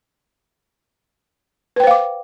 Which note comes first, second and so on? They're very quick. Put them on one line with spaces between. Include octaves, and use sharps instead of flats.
B4 G5 C5 F5 D6